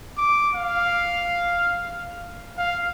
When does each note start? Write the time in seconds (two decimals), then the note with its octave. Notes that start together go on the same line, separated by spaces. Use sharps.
0.17 D6
0.55 F5
2.58 F5